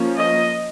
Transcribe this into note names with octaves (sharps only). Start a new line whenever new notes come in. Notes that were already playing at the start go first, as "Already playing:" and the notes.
Already playing: F3 A#3 C#4
D#5